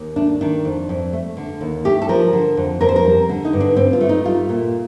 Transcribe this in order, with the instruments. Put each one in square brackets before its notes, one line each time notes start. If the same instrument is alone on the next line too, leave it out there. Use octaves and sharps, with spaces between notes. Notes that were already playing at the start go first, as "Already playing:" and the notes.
Already playing: [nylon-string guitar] D#2
A3 D4
D#3 D4
F2
F2
A3
D3
D#2
A3 G4
A4
F3 A#4
D3
F2
F2 A#4
C5
A#4
G3
D3
D#4
G2
D4
G2 C4
F4
A3
D#4
G3 F4
A#2